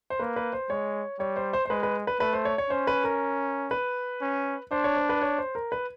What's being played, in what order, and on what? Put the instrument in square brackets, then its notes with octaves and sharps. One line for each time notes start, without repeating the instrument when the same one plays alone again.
[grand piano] C5
[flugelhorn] A#3 [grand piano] B4
[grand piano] B4
C5
[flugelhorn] G#3 [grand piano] C#5
[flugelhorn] G3 [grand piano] C#5
[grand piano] C5
C5
C5
[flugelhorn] G#3 [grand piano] B4
[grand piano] B4
B4
[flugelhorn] A3 [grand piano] B4
[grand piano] C5
C#5
C#5
[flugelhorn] C#4 [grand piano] C5
[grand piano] B4
A#4
B4
[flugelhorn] C#4
[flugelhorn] D4 [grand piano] C5
[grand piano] C#5
C5
B4
C#5
C5
A#4
B4